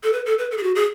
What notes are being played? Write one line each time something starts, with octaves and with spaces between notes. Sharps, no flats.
A4
B4
A4
B4
A4
G#4
F#4
G#4